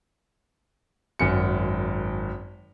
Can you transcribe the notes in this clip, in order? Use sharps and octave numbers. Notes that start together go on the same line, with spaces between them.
G#1 F#2 C#7